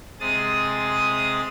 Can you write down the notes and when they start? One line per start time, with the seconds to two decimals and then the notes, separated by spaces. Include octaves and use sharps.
0.20 C3 G#3 G#4 D#6 A6